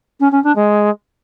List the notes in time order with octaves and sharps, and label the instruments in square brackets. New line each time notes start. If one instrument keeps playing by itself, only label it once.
[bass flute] C#4
C#4
D4
G#3